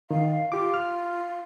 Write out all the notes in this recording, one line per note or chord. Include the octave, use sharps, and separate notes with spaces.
D#3 F5
F4 G4 D6
F6